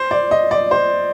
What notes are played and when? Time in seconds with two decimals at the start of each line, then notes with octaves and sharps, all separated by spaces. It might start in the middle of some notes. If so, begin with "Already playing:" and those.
Already playing: C5
0.11 D5
0.31 D#5
0.51 D5
0.71 C5